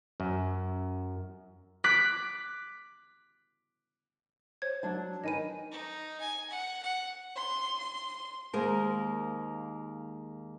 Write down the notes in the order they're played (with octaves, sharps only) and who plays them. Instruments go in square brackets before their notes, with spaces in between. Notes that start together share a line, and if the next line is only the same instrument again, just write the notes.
[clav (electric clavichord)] F#2
[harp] D6 F#6 B6
[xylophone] C5 C#5 G#6
[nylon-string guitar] F#3 D4 A5
[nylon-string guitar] D#3 B4 [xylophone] D#5 G#5 D#7
[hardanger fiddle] D#4
G#5
F#5
F#5
[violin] C6
C6
[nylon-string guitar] D#2 G#3 A#3 A#4 C5